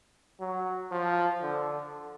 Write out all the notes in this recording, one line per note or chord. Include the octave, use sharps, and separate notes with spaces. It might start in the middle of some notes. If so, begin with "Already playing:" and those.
F#3
F3
D3